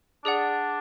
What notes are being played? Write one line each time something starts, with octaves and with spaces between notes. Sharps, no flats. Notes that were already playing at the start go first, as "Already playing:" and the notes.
D4 G#4 D5 F#5